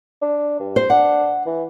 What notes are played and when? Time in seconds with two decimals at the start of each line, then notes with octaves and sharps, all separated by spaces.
0.22 D4
0.60 G2
0.76 C5
0.90 D4 F#5
1.46 E3